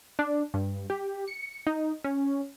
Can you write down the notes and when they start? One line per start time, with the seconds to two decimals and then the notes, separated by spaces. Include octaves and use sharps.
0.19 D4
0.54 G2
0.90 G4
1.28 C#7
1.67 D#4
2.04 C#4